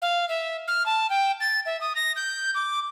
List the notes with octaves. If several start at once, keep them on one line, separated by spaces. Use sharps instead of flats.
F5
E5
F6
A5
G5
A6
E5
D#6
A#6
G6
D6